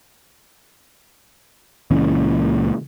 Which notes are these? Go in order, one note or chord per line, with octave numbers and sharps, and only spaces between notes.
C#2 A#2 E3 C#4